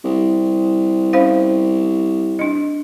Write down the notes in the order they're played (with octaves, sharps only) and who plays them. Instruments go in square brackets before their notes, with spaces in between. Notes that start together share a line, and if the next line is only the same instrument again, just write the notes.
[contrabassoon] C2
[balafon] C#4 C5 F5
D4 D#5